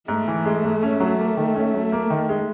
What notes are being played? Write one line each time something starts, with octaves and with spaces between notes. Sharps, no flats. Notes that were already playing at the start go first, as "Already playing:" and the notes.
G#2 A3
E3
G#3
G#2
C#4
F#3
A#3
D#3
C#4
F#3
A#3
D#3
G#3